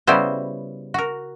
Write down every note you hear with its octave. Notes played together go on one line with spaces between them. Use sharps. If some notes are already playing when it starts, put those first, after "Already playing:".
C#3 G3 B3 E4 F#4 C5
F#4 A#4